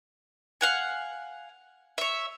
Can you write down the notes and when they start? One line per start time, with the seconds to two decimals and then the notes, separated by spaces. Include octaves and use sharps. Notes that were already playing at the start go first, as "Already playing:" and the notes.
0.61 F5 F#5 G#5
1.98 C#5 E5